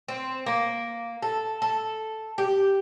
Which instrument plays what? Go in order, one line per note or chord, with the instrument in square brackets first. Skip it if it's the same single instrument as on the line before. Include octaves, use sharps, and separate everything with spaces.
[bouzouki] C4
A#3
A4
A4
G4